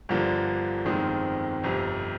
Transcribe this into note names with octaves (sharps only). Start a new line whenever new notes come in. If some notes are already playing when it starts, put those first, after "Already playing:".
G1 G2 D3 F3 A#3
G1 F2 D#3 G#3 C4
G1 F2 C3